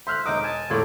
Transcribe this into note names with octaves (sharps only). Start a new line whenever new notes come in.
C5 E5 C6 F6 F#6
E1 D#4 C5 D#5 D6 D#6
G#5 A5
E1 A2 F4 C#5 D5 D6